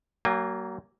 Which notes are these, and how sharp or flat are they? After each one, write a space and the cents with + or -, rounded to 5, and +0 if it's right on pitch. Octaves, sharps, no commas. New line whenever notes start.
F#3 +35 A#3 +0 G#5 -35